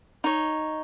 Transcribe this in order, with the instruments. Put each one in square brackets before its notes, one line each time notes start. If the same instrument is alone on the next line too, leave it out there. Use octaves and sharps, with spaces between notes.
[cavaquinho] D#4 C#5